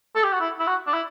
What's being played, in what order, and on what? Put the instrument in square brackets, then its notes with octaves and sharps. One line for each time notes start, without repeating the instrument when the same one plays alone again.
[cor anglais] A4
G4
F#4
E4
E4
F#4
D4
E4